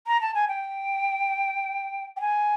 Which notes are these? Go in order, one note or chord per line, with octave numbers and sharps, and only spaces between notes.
A#5
A5
G#5
G5
G5
G#5